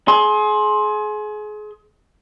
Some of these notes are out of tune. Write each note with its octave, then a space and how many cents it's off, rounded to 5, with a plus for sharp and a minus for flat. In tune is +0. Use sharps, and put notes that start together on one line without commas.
G#4 +30 C6 +20